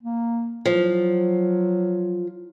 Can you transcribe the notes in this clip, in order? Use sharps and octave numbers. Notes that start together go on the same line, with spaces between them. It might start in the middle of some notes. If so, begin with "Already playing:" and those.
A#3
F3 F#3